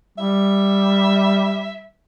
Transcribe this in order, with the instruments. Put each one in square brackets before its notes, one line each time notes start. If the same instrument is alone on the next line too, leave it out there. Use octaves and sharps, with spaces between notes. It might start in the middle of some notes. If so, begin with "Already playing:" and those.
[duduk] G3 [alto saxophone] E5